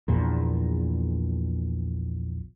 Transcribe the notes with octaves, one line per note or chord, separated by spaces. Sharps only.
A#1 E2 A#2